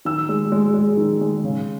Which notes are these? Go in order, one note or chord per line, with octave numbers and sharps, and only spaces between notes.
D#3 E6
G#3
G#3
G#3
D#3
G#3
C#3